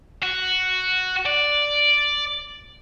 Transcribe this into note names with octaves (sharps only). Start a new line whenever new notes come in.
F#4
D5